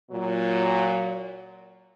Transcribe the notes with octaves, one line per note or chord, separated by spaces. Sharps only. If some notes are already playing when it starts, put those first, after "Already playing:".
A#2 F#3